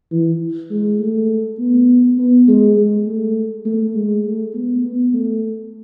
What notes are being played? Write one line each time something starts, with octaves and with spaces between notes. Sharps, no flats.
E3
G#3
A3
B3
B3
G#3
G#3
A3
A3
G#3
A3
B3
B3
A3